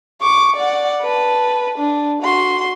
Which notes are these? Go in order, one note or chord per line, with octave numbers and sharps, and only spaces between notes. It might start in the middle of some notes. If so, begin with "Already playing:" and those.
C#6 D6
D5 F#5
B4 A5
D4
F#4 C6